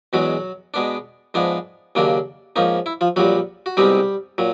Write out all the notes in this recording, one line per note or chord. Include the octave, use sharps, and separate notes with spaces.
E2 B2 F#3 G#3 F#4
B2 G#3 B3 D4
G#2 F3 G#3 B3 D4
D#2 C#3 F#3 A#3 D4
G#2 F3 A#3 C#4 D#4
E4
F3 F4
A#1 A#2 F#3 G3 F#4
F#4
C2 B2 G3 G#3 C4 D#4 G4
A#2 F#3